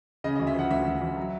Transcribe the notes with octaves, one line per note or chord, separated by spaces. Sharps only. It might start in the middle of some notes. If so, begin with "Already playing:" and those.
C#3 D#5
D#5
D2
E5
F3 F#5
D2 E5
D2
D2
F#3